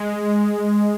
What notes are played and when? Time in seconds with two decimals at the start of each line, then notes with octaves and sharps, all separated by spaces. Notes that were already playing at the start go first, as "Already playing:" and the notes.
Already playing: G#3